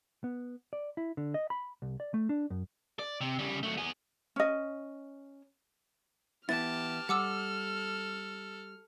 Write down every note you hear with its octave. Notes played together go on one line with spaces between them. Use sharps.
B3
D5
E4
D3
D#5
B5
C2
D5
A3
D4
F#2
D5
C3
C#3 G3
F#3 A3
B3 G#4
C#4 D#5
E3 B3 E4 G4 A5 F6 A6
G3 A4 F#5 D6 E6